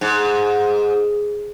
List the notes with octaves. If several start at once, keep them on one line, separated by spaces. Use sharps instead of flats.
G#2